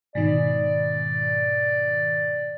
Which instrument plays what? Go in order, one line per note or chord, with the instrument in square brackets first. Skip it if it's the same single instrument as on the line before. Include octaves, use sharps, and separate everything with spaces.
[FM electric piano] G#2 B2 D#3 [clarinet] D5